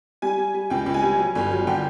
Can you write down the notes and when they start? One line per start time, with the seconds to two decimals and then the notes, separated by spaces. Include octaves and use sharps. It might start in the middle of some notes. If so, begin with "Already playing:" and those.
0.22 G3 G#5
0.38 G3
0.54 G3
0.70 C#2 G5
0.86 C#2
0.94 G#5
1.03 G3
1.18 F#3
1.35 G1
1.51 F#3
1.67 D3 G5